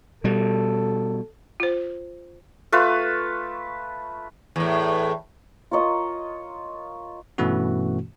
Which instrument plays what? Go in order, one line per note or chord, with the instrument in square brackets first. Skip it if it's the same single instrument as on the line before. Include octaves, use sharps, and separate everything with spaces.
[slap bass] B2 G3 [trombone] A4
[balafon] F4 C5
[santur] A3 F4 B4
[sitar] E2 A2
[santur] F4 A#4 C#5 D#5
[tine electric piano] G2 B2 E3 A3 C#4 F#4